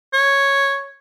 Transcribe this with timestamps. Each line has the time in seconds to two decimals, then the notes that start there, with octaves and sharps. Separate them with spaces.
0.13 C#5